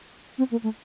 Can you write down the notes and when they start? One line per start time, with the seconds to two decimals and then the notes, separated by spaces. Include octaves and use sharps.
0.38 C4
0.51 A#3
0.63 A3